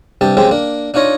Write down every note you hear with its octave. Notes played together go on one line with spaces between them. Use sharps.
G2 C3 G4 A5
C#3 F3 G#3 C4 G4
A#3 D4
D4 D#4 F4 C#5 D#5